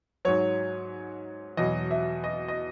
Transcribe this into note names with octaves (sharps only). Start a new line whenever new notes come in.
G#2 F#3 C#5
E2 B2 F#3 D#5
E5
D#5
D#5